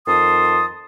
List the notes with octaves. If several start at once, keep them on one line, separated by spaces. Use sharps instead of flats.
F2 D#3 A5 C6 D#6